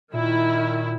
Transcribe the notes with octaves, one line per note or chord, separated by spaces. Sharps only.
A#2 D#3 E4